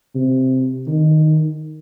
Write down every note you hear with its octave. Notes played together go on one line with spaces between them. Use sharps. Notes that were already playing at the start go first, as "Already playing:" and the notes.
C3
D#3